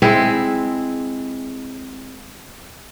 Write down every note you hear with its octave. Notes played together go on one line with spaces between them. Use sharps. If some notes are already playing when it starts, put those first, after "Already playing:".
G#3 C4 E4